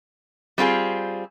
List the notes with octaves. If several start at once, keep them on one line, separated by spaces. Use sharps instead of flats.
G3 C4 F4 G#4